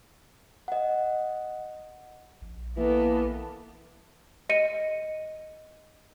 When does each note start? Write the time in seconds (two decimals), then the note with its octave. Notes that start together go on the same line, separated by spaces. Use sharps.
0.68 D#5 F#5
2.42 A#1
2.77 E3 A#3 B3 A4
4.49 D#5 C#7 D#7